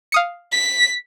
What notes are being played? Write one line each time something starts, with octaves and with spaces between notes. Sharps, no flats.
F5 D#6 C#7
B6